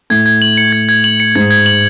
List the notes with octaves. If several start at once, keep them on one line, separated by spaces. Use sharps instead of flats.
A2 G#6
G#6
F#7
C#7
G#6
G#6
F#7
C#7
G#2 G#6
G#6
F#7